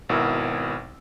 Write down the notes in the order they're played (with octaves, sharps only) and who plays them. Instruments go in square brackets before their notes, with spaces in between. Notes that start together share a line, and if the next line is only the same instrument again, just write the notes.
[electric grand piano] G#1 B2 E4 F#4 A#4 E6